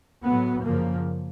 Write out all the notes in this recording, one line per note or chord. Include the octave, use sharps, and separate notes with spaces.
A2 F#3 B3
F#2 C#3 F3 A#3